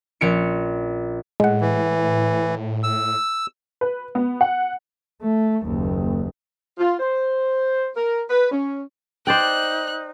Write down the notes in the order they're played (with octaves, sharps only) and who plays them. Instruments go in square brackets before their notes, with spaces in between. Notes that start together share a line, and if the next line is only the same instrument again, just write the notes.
[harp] A#1 C#4 C#7 D7
[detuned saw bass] A2 [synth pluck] G#3 F#5
[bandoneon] E3
E6
[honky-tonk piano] B4
B3
F#5
[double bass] A3
F#1 D#2
[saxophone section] F4
C5
A#4
B4
C#4
[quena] D#4 [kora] C5 D5 G5 [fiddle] F#6